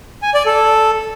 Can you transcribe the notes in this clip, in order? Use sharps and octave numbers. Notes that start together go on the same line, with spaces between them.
G#5
D5
A4